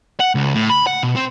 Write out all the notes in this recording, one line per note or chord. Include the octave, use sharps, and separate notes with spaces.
F#5
C#2
A2
B5
F#5
B2
C4